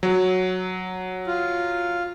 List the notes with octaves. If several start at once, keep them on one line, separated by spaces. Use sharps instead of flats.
F#3
F4